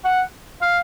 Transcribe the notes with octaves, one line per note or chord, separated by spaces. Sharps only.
F#5
F5